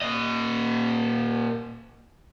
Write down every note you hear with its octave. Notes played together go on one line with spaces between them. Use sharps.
A#2 D#5